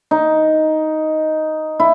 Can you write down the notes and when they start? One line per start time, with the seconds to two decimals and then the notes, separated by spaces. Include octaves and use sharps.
0.11 D#4
1.80 E4